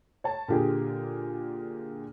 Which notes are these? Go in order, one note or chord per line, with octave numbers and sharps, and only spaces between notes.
C#5 A5
A#2 D3 G4 G#4 A#4